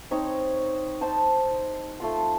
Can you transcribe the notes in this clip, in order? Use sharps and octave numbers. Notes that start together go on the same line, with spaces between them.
C4 D#4 C#5
D#4 C5 A5
A3 F4 C6